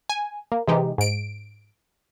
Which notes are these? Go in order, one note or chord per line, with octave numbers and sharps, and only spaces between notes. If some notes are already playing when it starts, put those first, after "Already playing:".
G#5
A#3
C3 E3 G#3 D#4 G4
G#2 D7